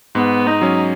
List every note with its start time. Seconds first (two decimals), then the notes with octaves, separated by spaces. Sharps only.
0.15 G#2 B3
0.46 D#4
0.62 F#3 C#4